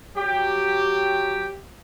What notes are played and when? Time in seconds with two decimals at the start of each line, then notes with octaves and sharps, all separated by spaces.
0.16 F#3 G4